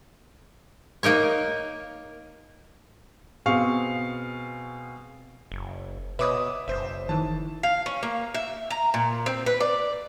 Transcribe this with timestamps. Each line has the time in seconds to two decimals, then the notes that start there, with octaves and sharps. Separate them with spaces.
1.03 A#3 D#4 A#4 C#5
3.46 B2 C4 G#4 F5 C#6
5.52 F#1
6.19 B2 B4 C#5 D#5 E5 D6 D#6
6.68 F#1 C5 E5
7.09 D#3 E3 A5
7.63 F5
7.86 C#4
8.03 A#3
8.34 E5
8.70 A#5
8.94 A#2
9.26 C4
9.46 B4
9.60 D5